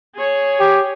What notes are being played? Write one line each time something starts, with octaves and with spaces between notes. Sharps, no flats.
G#4 C#5
G4